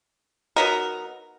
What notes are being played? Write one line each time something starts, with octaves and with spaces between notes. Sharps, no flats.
F#3 B3 D#4 A#4